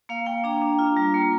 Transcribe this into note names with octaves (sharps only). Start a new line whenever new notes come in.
A#3 F5
A#3 G5
D4 A#5
D4
F4
G3
A#3